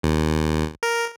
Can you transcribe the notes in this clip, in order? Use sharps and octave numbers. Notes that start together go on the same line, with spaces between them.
D#2
A#4